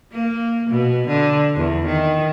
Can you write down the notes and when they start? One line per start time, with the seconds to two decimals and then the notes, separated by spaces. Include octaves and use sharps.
0.12 A#3
0.70 B2
1.08 D3
1.56 E2
1.87 D#3